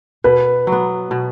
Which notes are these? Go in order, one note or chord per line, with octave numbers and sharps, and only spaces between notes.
B2 B4
F#3
B3
B2